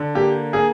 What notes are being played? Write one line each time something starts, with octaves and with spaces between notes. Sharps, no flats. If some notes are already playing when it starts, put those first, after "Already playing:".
Already playing: D3
A#3 G4
A#3 G#4